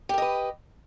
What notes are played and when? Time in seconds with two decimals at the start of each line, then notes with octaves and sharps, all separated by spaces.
0.09 G4
0.14 A#4
0.18 D#5
0.22 B4